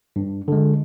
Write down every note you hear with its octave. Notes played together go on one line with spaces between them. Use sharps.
G2
D3 G#3